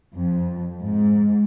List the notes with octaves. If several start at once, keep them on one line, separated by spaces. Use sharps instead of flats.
F2
G#2